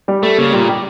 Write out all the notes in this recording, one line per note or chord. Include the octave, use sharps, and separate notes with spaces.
G3
A3 A4
C#3 A#3
A#2 G3
G4